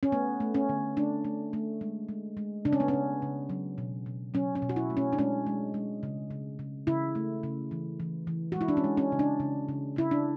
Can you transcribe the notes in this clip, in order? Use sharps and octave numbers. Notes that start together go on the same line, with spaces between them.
C#4
A3 B3
A3
C#4
D3
A3 D4
A3
A3
G#3
G#3
G#3
C#3 D4
C#4
B3
C#4
C#3
C#3
F#3
B2
B2
F#3 C#4
C#4
B2
F#4
E4
A3
C#4
D4
G#3 C#4
G#3
G#3
C#3
C#3
C#3
C#3 E4
A3
C#3
E3
E3
E3
F#4
G#3
E4
D4
C#4
G#3
C#4
C#3
D4
C#3
C#3
C#3 E4
D4